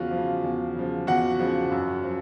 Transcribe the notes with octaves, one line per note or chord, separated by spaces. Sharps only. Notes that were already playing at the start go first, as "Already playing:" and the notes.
Already playing: E2 C#3 F3 F4 F#4
C#3 F3
E2
C#3 F3
E2 F#4 F#5
C#3 F3
F#2
F3